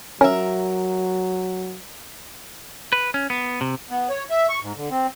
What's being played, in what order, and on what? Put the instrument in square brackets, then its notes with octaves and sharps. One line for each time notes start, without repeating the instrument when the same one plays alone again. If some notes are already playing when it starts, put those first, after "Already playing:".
[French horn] F#3 [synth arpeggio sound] C#4 [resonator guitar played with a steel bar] A#4 E5
[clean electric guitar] B4
C#4
B3
C3
[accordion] B3
C#5
E5
C#6
G#2
D3
C4